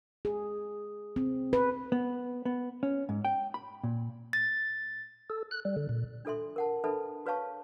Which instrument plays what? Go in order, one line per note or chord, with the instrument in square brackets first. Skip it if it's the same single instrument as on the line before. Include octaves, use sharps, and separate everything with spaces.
[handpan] G#4
C4
B4
[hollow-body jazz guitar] B3
B3
C#4
G#2
G5
B5
A#2
[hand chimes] A6
[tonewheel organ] A4
F#6
G3
D3
A#2
[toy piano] D4 F4 A4 E5 C6
A#4 F#5 A5
D4 A4 B4 E5 A5 B5
F#4 B4 C#5 F5 A5 C#6